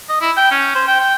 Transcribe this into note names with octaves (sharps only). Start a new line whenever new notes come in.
D#5
E4
G5
C#4
C5
G5
G5